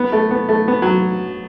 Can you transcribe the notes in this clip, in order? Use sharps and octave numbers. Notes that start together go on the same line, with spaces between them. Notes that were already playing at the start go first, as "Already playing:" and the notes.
Already playing: B3
A3
B3
A3
B3
F#3